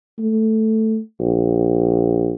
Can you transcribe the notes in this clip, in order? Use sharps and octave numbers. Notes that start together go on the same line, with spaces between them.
A3
A#1